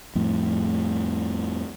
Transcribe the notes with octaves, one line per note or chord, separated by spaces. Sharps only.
F2 A2